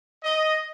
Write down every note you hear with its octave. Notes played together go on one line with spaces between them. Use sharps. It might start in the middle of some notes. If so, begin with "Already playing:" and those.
D#5